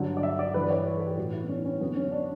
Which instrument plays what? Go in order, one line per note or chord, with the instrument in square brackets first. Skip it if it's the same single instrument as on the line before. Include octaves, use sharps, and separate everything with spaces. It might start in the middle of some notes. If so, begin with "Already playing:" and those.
Already playing: [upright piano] G2 D3 F#3
D5
E5
D5
G2 E3 B4
C#5
B4
A4
G4
A2 E3 F#4
E4
B3
C#4
C#4
F#2 D3 F#3 B3
C#4
D4